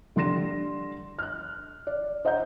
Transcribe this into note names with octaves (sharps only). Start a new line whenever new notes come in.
D3 G3 C6 A#6 E7
F6 F#6
D5
C5 D#5 F#5 A#5 G6